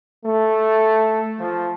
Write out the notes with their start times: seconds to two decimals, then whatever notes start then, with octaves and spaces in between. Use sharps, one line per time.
0.25 A3
1.40 F3